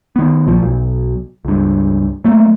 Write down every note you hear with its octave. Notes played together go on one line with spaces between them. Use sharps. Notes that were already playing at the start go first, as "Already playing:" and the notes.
D#3 B3
A#1 F3
B1
C#2 G2
F#3 A3 A#3